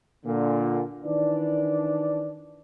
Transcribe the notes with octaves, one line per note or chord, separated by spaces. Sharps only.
A#2 D3
D#3 E3 D4 D5